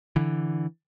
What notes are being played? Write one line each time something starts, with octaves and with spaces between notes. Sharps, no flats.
D3 E3